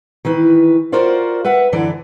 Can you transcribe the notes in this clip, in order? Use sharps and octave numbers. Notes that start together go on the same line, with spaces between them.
D#3 E3 B4
F4 F#4 A#4 C5 D5 F5
B4 E5 F#5
F#2 D3 E3 D5